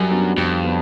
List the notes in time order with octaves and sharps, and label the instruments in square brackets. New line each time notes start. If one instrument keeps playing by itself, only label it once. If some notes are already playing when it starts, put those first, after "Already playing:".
Already playing: [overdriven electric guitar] F#2 [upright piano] G3
[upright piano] B3 D4 F#4
[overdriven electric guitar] F2 [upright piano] G3
[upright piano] B3 D4